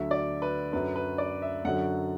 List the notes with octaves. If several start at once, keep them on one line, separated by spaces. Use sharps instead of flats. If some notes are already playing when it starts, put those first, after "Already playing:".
Already playing: D2 D3 F#3 E5
D5
B4
F#2 D3 F#3 B4
B4
D5
E5
F#2 D3 F#3 F#5